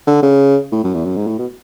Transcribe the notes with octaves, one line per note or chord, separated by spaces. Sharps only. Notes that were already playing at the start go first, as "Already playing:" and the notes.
D3
C#3
A2
F#2
E2
F#2
G#2
A2
B2